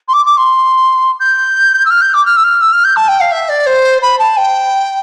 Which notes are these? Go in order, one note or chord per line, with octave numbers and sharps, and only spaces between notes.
C6
D6
D6
C6
G6
E6
F6
G6
D6
F6
E6
F6
E6
F6
G6
A5
G5
F5
E5
D5
C5
B5
A5
G5